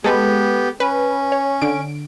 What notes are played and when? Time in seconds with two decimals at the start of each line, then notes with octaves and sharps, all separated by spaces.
0.04 G#3 B3 G4 A4 B4
0.80 C#4 B4
1.32 C#5
1.62 D3 D7